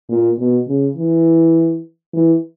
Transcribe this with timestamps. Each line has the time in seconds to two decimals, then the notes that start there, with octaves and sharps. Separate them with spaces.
0.09 A#2
0.39 B2
0.68 C#3
0.97 E3
2.13 E3